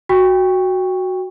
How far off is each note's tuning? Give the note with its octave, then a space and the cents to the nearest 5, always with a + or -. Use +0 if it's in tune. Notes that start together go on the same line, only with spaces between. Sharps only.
F#4 +0 G5 +20 C#6 +0